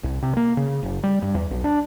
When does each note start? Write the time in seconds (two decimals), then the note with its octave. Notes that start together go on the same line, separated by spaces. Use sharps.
0.04 C2
0.22 C3
0.37 A#3
0.57 C#3
0.83 F#1
1.03 G3
1.22 G2
1.35 E2
1.51 B1
1.64 D4